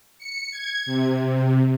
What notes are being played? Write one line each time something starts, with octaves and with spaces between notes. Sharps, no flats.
C#7
G#6
C3